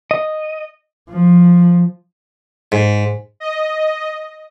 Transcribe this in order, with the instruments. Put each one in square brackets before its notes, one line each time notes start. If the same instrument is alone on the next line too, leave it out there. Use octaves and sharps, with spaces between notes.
[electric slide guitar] D#5
[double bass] F3
[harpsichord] G#2
[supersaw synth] D#5